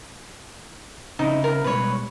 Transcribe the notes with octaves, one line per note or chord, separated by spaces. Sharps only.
C#3 C4 D#4 E4
A#4
B2 G3 G#3 B4 C#5